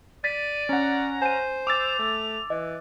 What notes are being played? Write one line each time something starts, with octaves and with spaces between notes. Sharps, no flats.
D5 A6 B6 D#7
C#4 F#5 A#5
C5 G#5 D#7
D6 E6 A6 F7
A3
E3 D#5